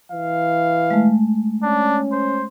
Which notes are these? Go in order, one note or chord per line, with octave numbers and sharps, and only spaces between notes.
E3 F5
G#3 A3
C#4 D4
C5